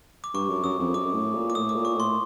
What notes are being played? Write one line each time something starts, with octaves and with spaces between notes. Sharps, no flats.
D6
G2 C#6
F#2
F#2 D#6
F2
F#2 D6
A2
A#2
D6
A2 D#6
D6
A#2
C#6
A2 C6